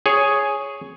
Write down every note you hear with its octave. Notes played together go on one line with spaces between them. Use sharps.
G#4 C#5